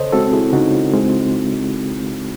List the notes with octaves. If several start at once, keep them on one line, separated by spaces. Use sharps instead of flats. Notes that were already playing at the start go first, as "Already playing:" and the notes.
Already playing: C#3 A4 C5 C#5 D#5
G#3 C4 F#4 A4
E4 G#4
C#3 D#4 F#4
G#3 C4